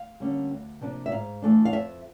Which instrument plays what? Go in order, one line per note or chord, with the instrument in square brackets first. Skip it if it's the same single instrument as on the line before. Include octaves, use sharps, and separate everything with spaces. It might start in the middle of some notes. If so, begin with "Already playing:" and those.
Already playing: [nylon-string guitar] F5
D3 G3 A#3 C#4
D2
C3 F3 A#3 D4
E5
G#2 F5
E3 A3 D4
F5
F2 E5